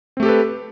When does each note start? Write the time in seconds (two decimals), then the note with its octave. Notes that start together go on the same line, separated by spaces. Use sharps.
0.17 C4
0.20 A3
0.23 G4
0.26 A4
0.29 B4